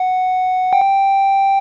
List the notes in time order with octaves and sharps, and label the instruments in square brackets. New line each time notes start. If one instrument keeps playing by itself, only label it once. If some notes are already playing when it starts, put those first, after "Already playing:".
Already playing: [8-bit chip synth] F#5
G5